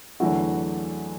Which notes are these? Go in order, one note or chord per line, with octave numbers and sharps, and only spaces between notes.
E2 D3 F#3 A3 E4 F#4